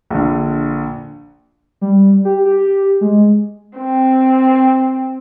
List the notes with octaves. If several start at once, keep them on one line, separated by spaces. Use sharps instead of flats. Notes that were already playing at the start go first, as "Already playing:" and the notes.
A#1 D3
G3
G4
G4
G#3
C4